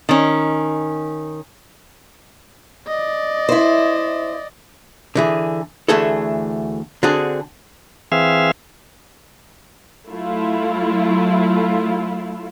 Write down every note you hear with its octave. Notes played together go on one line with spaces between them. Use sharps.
D#3 C#4
D5 D#5
E4 C5
D3 E3 G#4
D2 E3 A3 G#4 A4
D3 C4 D4 F#4 G#4
E3 C4 G#4 E5 F5
F#3 A3 E4 F4